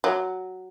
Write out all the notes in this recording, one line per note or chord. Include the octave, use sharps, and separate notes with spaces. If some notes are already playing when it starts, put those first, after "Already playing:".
F#3